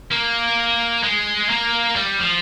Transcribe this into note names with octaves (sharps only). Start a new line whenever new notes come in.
A#3
G#3
A#3
G3
F3